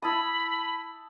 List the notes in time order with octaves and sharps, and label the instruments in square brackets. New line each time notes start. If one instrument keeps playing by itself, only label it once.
[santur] E4 A5 D#6 [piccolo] B5